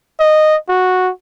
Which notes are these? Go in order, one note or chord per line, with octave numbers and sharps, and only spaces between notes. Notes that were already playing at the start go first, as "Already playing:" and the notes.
D#5
F#4